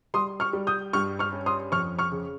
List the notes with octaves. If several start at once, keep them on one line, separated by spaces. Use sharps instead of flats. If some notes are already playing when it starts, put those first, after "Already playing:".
G3 C6 D#6
C#6 F6
G3
D#6 G6
G2 C#6 F6
C#6 F6
C#4
C6 D#6
F2 C#6 F6
C#6 F6
C#3